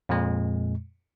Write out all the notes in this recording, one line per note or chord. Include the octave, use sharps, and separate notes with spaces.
F2 A#2 G#3